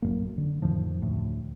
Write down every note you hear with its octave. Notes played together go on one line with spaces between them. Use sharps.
A1 F#2 A#3
D3
F2 A2 D#3 F3
D2 A2